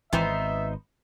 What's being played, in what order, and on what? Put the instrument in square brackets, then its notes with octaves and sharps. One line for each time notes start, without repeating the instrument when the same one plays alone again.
[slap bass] G#1 [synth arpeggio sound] E3 C4 [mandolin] B3 D#4 C5 [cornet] E5